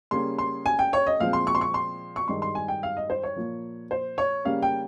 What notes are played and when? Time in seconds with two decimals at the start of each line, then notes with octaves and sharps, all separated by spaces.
0.11 C#3 G3 A#3 C#4 C6
0.38 C6
0.66 G#5
0.79 G5
0.93 C#5
1.07 D#5
1.20 A#2 F3 G#3 C4 F5
1.33 C6
1.47 C#6
1.55 C6
1.61 C#6
1.74 C6
2.16 C#6
2.28 G2 D#3 G#3 C6
2.42 C6
2.55 G#5
2.68 G5
2.83 F5
2.97 D#5
3.10 C5
3.23 C#5
3.36 A#2 F3 A#3
3.91 C5
4.18 C#5
4.45 C#3 G3 A#3 C#4 F5
4.63 G5